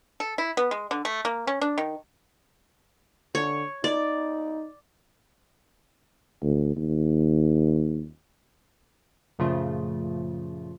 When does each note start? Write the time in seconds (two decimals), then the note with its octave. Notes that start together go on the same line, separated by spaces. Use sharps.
0.20 A4
0.38 E4
0.57 B3
0.71 G#3
0.91 D3
1.05 A3
1.25 A#3
1.47 C#4
1.61 D4
1.78 D#3
3.35 D3 C#5
3.84 D#4 D5
6.43 D2
6.77 D#2
9.39 F#2 A#2 C#3 F3 A3 F4